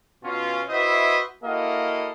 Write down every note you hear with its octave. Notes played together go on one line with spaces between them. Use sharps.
B2 C#4 F4
E4 F#4 B4 C5 D#5 E5
A#3 E4 F#4 A4 D#5 F5